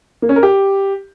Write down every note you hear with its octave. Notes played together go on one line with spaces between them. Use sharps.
A#3
C#4
A#4
G4